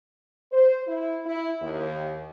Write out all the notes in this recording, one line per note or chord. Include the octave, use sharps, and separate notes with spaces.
C5
E4
E4
D#2